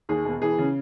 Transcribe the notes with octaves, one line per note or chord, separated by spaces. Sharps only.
D#2 G#4
E1
E3 G#4
C#3